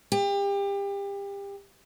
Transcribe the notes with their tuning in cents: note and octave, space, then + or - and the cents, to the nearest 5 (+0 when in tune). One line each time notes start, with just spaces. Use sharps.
G4 +30